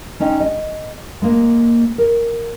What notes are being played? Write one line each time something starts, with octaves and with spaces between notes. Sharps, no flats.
G#3 C#4 D#4 D#5 G5
D#5
G#3 A#3
A#4